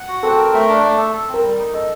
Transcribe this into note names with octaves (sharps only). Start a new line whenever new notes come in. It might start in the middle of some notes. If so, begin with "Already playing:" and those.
Already playing: F#5
F#4
C4 A4
A#4
A3
D4
A3
A4
A4
C4
A#4
G3
D#4
A4 D#5